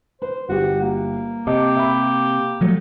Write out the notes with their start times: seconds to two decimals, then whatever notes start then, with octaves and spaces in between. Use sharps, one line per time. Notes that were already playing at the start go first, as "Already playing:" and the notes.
0.22 B4 C5
0.49 G1 F#4 G4
0.81 A#3
1.47 C3 G4 D#5 A5 D6
1.77 E5 B5
2.61 F3 F#3 A3